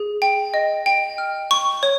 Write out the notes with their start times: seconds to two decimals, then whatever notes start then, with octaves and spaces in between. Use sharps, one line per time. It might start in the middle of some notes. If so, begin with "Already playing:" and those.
Already playing: G#4
0.22 G5
0.54 D#5
0.86 G5
1.18 F6
1.51 C#6
1.83 C#5